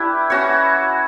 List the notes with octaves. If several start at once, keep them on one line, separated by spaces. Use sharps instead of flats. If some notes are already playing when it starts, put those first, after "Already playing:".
Already playing: D4 E4 G4 B4
C#4 F#4 C#5